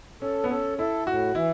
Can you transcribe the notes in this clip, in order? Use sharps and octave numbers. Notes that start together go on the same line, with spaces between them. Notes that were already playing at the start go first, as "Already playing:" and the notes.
C#4 A4
B3
C#4 A4
E4 A4
A2 F#4
E3 E4